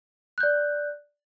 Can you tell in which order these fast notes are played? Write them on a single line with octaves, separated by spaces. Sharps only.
F#6 G6 D5